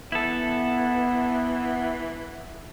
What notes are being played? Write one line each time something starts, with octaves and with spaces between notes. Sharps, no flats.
E3 B3 E4 A4